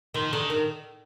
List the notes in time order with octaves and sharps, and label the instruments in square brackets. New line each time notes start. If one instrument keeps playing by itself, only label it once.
[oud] D#3 [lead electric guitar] F3
[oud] D3 [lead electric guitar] D#3
[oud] D#3